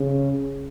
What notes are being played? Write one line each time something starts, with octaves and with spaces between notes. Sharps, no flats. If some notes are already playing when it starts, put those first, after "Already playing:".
Already playing: C#3